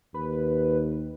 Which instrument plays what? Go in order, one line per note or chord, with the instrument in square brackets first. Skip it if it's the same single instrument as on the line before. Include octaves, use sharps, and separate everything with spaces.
[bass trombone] D#2 [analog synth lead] B4